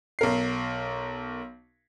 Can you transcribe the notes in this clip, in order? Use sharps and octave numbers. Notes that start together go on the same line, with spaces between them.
B1 A#4 C7